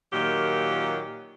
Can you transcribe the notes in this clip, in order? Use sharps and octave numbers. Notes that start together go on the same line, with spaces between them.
A#2 D#3 F#3 F4 G4